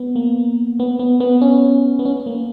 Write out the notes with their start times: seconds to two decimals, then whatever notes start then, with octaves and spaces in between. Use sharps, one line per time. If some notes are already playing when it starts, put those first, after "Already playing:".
Already playing: B3
0.16 A#3
0.80 B3
0.99 B3
1.20 B3
1.41 C#4
1.99 B3
2.05 C#4
2.26 A#3